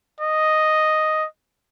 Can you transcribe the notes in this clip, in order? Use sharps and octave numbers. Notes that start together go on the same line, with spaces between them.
D#5